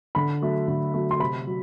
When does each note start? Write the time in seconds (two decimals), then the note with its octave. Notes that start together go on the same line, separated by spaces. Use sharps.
0.15 D3 B5
0.42 F#3 A3
0.68 D3
0.94 F#3 A3
1.11 C6
1.20 C3 B5
1.47 F#3